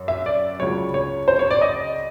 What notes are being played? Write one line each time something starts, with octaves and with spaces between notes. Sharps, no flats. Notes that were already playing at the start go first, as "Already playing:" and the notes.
Already playing: F#2
E5
D5
C#2 C#3 F#3 C#5
C#5
C5
C#5
D5
D#5